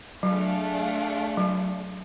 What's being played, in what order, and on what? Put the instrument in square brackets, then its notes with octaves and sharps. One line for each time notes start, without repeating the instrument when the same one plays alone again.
[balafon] F#3 [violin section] A3 D4 G#4 D5 F5
[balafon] F#3